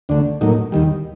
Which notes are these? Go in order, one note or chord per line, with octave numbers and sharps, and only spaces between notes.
D2 D3 A3 D4
A2 F#3 A#3 D#4
D#2 D#3 G3